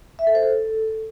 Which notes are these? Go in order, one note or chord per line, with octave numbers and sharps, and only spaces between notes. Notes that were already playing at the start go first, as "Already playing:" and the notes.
E5
A4
C5
A4